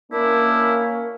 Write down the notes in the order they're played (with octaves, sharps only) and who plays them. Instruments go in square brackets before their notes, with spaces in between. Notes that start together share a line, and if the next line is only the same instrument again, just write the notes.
[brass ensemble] A#3 C#4 [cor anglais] D4 [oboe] E4 [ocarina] A#4